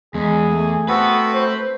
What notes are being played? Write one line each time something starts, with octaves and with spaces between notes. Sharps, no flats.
E2 G#3 G#4
A3
B3 C4 F#4 A4 B4
C5